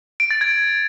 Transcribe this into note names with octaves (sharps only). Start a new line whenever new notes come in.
D7
A6
G#6